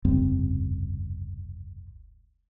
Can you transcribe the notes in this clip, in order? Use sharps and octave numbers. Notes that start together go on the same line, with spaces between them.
F1 C#2 G2 C4